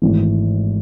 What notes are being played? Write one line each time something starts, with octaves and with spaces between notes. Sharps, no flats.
G#1 G#2 E3 A3